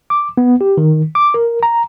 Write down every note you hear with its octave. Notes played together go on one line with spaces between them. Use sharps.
D6
B3
G4
D#3
D6
A#4
A#5